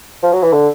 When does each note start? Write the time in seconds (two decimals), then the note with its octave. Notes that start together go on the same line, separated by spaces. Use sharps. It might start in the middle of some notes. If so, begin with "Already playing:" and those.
0.23 F3
0.33 F#3
0.43 E3
0.53 D3